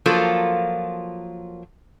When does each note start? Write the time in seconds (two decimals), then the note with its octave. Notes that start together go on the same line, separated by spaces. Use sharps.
0.06 F3 F#3 A#3 F4 A4